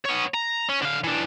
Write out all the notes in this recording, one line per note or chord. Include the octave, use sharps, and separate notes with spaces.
B3 C#5
A#5
C#4
D3 F5
E3 D4